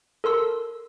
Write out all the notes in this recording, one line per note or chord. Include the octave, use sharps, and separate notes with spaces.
A4 A#4 C6 E6